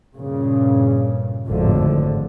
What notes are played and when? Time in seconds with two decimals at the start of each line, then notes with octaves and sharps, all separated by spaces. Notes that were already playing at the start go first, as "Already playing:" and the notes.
0.16 G2 A#2 C#3
1.47 G#1 F2 A2 D3 F3